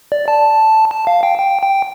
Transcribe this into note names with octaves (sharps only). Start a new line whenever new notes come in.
D5
A5
A5
F5
G5
G5
G5